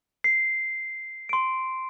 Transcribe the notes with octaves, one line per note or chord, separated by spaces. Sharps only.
C7
C6 D7